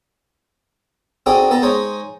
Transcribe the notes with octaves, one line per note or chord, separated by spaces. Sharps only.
C4 D4 D#4 F#4 G#4 A4
B3 A4 A5 A#5
G#3 D#4 G#4 C5 C#5